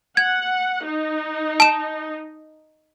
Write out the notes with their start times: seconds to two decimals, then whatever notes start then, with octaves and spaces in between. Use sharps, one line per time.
0.17 F#5 G#6
0.85 D#4
1.60 A5 E7